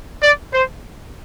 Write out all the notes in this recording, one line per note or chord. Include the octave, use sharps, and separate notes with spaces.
D5
C5